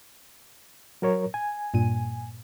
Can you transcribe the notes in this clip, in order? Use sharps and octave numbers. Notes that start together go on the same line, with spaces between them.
F#3 A#4 C#5
G#5
G2 A#2 D#7